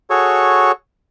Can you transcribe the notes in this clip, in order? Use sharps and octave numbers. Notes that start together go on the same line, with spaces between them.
F#4 G#4 A4 C#5 C#6